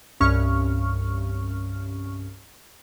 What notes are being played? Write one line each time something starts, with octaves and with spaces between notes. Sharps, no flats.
C2 G2 C#4 C#6 F6